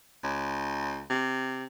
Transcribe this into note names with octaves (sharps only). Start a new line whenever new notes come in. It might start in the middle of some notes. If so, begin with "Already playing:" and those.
C#2
C3